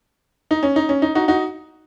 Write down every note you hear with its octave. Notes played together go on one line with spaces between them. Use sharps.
D#4
C#4
D#4
C#4
D#4
D#4 F#4
D#4 F#4